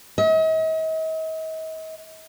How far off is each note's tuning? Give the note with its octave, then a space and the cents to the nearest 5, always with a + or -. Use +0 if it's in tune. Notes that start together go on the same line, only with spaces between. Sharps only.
D#5 +40